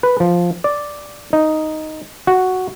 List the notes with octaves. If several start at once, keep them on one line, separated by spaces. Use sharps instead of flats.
B4
F3
D5
D#4
F#4